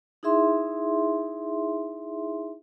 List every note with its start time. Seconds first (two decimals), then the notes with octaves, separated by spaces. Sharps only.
0.23 D#4 E4 G#4 E5 C6